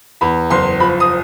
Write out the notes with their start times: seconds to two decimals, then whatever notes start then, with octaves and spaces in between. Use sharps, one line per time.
0.21 E2 B5
0.50 F#1 C6
0.80 F3 B5
1.00 D#6